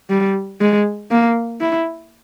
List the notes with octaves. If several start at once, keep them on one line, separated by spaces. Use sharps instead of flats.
G3
G#3
A#3
E4